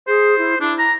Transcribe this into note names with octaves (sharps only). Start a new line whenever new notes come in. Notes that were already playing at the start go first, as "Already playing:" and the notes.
G#4 C5
E4
D4 E4
A#5